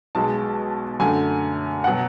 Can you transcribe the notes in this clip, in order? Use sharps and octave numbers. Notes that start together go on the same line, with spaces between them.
B1 B2 G#3 A5
F#2 D3 A3 G#5
B2 F#3 F#5